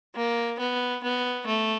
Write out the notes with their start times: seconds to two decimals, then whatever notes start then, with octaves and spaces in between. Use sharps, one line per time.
0.15 A#3
0.59 B3
1.03 B3
1.47 A3